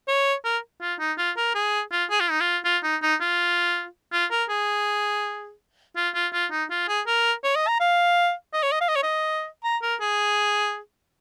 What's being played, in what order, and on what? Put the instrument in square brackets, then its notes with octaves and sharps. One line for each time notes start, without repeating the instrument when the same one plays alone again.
[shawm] C#5
A#4
F4
D#4
F4
A#4
G#4
F4
G#4
F4
D#4
F4
F4
D#4
D#4
F4
F4
A#4
G#4
F4
F4
F4
D#4
F4
G#4
A#4
C#5
D#5
A#5
F5
D#5
C#5
D#5
F5
D#5
C#5
D#5
A#5
A#4
G#4